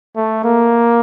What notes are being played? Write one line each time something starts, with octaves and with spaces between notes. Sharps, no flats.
A3
A#3